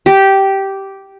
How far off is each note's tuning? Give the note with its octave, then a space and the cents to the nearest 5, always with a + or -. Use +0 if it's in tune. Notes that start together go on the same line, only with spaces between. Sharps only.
G4 -10